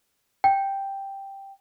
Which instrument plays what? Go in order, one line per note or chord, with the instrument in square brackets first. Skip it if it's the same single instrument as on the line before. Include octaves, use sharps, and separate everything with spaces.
[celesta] G5